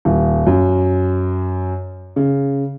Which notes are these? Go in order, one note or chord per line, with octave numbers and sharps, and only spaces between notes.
D#1
F#2
C#3